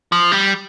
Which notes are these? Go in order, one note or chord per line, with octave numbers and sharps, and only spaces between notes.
F3
G3